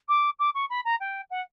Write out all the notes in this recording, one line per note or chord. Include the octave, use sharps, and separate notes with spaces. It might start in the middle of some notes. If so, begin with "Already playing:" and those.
D6
D6
C#6
B5
A#5
G5
F#5